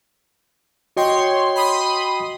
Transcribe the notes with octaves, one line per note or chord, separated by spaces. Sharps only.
F#4 C#5 D#5 G5 C6
B5 C6 D#6